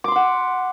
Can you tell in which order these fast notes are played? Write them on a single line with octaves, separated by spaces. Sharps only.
D6 C6 B5 F#5